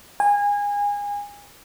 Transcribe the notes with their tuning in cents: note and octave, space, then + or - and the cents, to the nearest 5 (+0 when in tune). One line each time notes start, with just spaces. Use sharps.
G#5 -25